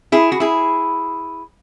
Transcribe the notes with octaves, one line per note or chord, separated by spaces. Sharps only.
E4 G#4
F#4
E4 G#4